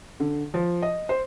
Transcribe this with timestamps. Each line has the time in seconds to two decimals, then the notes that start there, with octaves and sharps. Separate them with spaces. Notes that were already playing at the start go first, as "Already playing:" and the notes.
0.20 D3
0.54 F3
0.82 D#5
1.09 C5